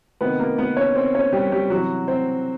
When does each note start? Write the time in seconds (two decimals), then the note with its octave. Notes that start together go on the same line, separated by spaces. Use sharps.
0.21 C3 D#3 B3 B4
0.39 A#3 A#4
0.58 B3 B4
0.77 C#4 C#5
0.95 C4 C5
1.15 C#4 C#5
1.33 G3 G4
1.52 G3 G4
1.70 C3 E3 F#3 F#4
2.08 C4 C5